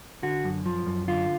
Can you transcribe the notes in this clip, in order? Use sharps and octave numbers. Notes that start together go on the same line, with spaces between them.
D3 F#4
F#2
F3
F#2
D3 F4